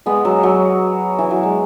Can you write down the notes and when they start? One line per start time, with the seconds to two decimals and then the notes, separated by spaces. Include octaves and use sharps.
0.06 G#3 B3
0.25 F#3
0.43 F#3
1.19 E3
1.31 F#3
1.43 G#3